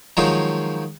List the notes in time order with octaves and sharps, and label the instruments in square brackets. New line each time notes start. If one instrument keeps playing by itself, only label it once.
[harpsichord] D#3 F3 F#3 G#3 F4